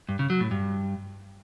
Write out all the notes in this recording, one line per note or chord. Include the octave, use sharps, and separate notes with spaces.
G2
C#3
F#3
A2
G2